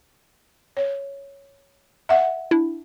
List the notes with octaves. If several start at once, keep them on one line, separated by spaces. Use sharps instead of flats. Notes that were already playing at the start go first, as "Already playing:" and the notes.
C#5
E5 F#5
D4 E4